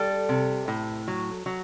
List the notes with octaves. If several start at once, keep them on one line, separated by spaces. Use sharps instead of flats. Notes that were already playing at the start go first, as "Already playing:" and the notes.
Already playing: G3 A4
C3
A2
F#3
F#3